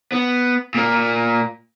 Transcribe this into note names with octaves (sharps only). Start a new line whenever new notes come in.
B3
A#2 A#3